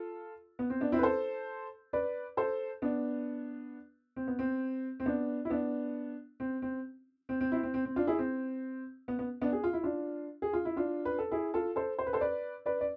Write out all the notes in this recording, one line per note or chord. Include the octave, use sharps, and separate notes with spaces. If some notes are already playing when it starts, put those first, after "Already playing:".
Already playing: F4 A4
B3
C4
B3 D4
C4 E4
B4
A4 C5
B4 D5
A4 C5
B3 D4
C4
B3
C4
C4
B3 D4
E4
B3 D4
C4
C4
C4
C4
C4 E4
C4
C4
C4
D4 F4
E4 G#4
C4
B3
B3
B3 D4
G#4
F4
E4
D4 F4
G#4
F4
E4
D4 F4
B4
A4
E4 G#4
F4 A4
A4 C5
C5
B4
A4 C5
B4 D5
B4 D5
D5